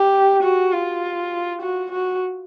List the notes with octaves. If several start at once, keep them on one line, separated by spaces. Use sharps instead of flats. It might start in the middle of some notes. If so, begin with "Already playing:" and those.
Already playing: G4
F#4
F4
F#4
F#4